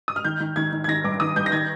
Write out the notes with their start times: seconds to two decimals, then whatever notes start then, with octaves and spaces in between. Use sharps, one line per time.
0.08 D#6
0.16 F6
0.24 D#3 G6
0.40 D#3
0.56 D#3 G#6
0.72 D#3
0.84 G#6
0.88 D#3 A#6
1.04 G2 D6
1.20 D#3 D#6
1.36 G2 G6
1.46 A#6
1.52 D#3 G#6